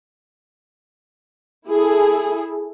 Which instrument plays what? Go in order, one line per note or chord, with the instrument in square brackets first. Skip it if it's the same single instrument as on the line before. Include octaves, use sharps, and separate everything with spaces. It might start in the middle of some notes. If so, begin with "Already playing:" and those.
[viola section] E4 G#4 A4